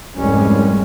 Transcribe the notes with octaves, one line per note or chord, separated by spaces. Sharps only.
F1 C2 G#2 G3 G#3 C#4